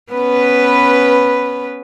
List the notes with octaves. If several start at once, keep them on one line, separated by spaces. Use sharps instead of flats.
B3 C#4 B4